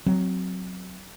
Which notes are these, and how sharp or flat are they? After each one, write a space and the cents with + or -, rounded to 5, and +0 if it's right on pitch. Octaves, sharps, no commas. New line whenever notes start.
F#3 +0 C4 +0